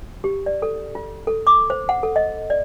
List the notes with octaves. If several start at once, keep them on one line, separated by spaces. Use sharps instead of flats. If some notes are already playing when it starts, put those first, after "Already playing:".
G4
D5
A4
F4
A4
D6
C5
F#5
A4
D#5
D5